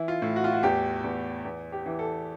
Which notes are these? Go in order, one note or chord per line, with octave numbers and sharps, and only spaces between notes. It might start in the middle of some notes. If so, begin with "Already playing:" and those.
Already playing: E3 E4
F4
A2
F#4
F4
F#4
E2 G4
E2
E2
G4
E3
A4